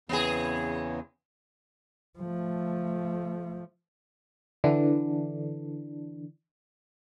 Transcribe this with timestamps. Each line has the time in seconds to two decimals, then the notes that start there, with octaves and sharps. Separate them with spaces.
0.09 E2 C#3 B3 C4 G#4
2.19 F3 A3
4.64 D3 E3 D4